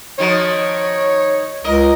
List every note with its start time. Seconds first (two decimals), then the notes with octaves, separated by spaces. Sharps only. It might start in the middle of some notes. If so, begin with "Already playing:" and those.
0.19 D#3 F3 F#4 C#5
1.64 C#2 A#4 D#5